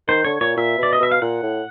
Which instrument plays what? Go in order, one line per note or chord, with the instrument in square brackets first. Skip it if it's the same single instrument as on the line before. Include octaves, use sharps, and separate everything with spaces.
[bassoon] D#3 [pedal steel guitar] C5
[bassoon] D3 [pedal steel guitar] C#5
[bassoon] A#2 [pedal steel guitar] C#5
[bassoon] A#2 [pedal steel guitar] E5
[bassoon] B2 [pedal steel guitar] D5
[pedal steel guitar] D#5
[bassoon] B2 [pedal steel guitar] E5
[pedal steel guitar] F5
[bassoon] A#2 [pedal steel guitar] F#5
[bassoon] A2